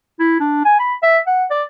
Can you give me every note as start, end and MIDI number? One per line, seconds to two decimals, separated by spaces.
0.20 0.39 64
0.40 0.64 62
0.65 0.78 80
0.80 0.94 83
1.03 1.18 76
1.27 1.45 78
1.50 1.63 74